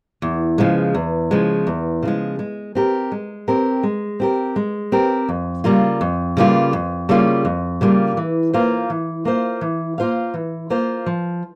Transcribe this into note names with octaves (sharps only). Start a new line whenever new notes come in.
E2
C#3 F3 G#3
E2
C#3 F3 G#3
E2
C#3 F3 G#3
G#3
C4 G4 A#4
G#3
C4 G4 A#4
G#3
C4 G4 A#4
G#3
C4 G4 A#4
F2
C#3 G3 A#3 F4
F2
C#3 G3 A#3 F4
F2
C#3 G3 A#3 F4
F2
C#3 G3 A#3 F4
E3
A#3 F4 C5 F5
E3
A#3 F4 C5 F5
E3
A#3 F4 C5 F5
E3
A#3 F4 C5 F5
F3